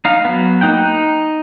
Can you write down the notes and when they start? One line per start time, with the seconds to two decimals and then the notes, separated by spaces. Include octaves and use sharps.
0.05 D#4 F5
0.25 F#3 B3
0.61 A#3 D#4 F#5 G5
0.77 D#4